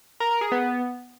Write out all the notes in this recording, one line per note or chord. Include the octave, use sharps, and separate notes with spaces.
A#4
A#4
G#4
B3